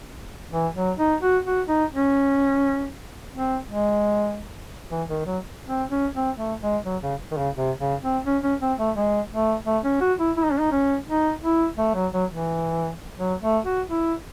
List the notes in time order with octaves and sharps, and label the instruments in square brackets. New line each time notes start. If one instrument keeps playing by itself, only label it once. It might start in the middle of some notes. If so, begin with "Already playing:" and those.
[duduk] E3
F#3
D#4
F#4
F#4
D#4
C#4
C4
G#3
E3
D#3
F#3
C4
C#4
C4
A3
G#3
F#3
C#3
D#3
C#3
C3
C#3
C4
C#4
C#4
C4
A3
G#3
A3
A3
C#4
F#4
E4
E4
D#4
C#4
D#4
C#4
D#4
E4
A3
F#3
F#3
E3
F#3
A3
F#4
E4